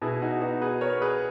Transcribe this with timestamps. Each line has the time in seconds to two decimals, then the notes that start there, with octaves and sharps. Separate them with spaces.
0.02 B2 E4 G#4
0.22 D#4 F#4
0.42 B3 D#4 F#4
0.61 G#4 B4
0.81 B3 A#4 C#5
1.01 G#4 B4